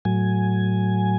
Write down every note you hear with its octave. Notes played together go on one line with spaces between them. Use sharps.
A2 F#3 G#5